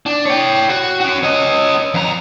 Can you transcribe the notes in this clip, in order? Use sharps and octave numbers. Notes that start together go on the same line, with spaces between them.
D4
C#5 G5
F#4
C#4 F#4
C#4 D#5
F2 A#5